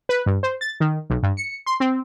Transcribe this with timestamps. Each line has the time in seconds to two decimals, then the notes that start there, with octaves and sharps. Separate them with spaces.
0.09 B4
0.26 G2
0.43 C5
0.61 A6
0.80 D#3
1.10 B1
1.23 G2
1.37 C#7
1.66 C6
1.80 C4